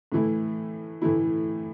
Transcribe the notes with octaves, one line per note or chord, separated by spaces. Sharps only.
A2 E3 A3 E4
A2 E3 A3 E4